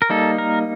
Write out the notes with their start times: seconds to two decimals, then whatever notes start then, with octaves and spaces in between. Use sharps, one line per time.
0.02 A#4
0.10 G3 A#3 D#4 A4
0.38 A#4